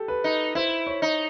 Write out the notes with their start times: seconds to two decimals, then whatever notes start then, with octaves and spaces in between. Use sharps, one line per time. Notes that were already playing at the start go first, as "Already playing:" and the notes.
Already playing: G4 A4
0.08 B4
0.24 D#4
0.55 E4 C5
0.87 C#5
1.02 D#4